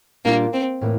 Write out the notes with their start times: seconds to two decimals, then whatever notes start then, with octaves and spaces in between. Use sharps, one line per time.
0.25 A#2 G3 A#3 D4 F4
0.53 C4
0.81 A2 E3 A#3